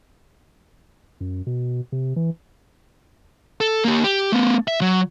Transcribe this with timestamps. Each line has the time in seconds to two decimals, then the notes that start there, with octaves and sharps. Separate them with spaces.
1.21 F#2
1.47 B2
1.92 C3
2.16 E3
3.61 A4
3.84 A#3 G4
4.04 G4
4.32 A3 B3
4.68 E5
4.81 F#3